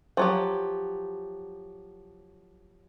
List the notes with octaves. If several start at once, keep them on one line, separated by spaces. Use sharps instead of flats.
F3 F#3 G4